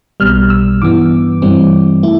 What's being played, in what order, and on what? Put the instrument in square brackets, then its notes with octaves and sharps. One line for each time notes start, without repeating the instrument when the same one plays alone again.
[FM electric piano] B1 B2 G3 F6
E6
G2 E3 B3 D6
G2 E3 G3 C4
A3 E4